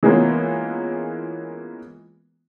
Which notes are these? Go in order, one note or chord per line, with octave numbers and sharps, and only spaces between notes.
E3 G#3 A#3 B3 C#4 F4